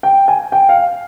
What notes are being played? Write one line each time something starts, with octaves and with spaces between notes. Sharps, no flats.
G5
G#5
G5
F5